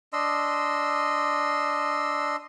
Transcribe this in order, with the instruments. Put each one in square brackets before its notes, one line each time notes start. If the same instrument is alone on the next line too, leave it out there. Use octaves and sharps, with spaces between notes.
[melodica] D4 D#5 C6 E6